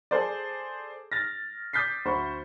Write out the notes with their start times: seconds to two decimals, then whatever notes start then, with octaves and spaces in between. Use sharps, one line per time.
0.11 G#4 A4 C5 D5
1.12 F6 A6 A#6
1.73 D6 D#6 G6 A6 B6 C7
2.05 D2 C5 B5 C#6